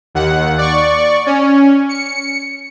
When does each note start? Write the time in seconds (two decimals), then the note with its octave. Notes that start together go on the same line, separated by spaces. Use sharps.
0.15 D#2 F#5
0.58 D5 C#6
1.26 C#4
1.89 C#7